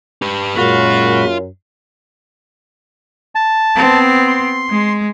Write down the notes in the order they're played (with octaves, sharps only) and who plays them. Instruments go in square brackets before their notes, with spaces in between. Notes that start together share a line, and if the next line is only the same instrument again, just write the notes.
[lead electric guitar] G4 B4
[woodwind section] F#2 [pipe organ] A#2 G#3 B5 [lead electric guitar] F4 [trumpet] F#4
[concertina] A5
[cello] B3 C4
[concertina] C6
[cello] G#3